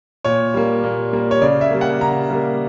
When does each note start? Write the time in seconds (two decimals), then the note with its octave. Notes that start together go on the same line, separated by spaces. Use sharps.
0.25 A#2 C#5
0.54 G3 A#3
0.84 A#2
1.13 G3 A#3
1.31 C#5
1.42 C#3 D5
1.61 E5
1.71 G3 A#3
1.81 F#5
2.01 C#3 A#5
2.30 G3 A#3